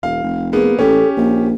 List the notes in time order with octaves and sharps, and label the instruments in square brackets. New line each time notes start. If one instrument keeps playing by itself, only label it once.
[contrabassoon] E1 [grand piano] F5
[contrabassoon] F1
[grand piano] A#3 B3 [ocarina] G#4
[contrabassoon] A1 [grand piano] C#4 G4 [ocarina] A4
[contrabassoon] A#1 [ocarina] A#3